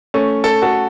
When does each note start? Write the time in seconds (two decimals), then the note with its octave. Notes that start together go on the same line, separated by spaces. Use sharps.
0.14 A3 C#4
0.44 A4
0.62 F#4 A4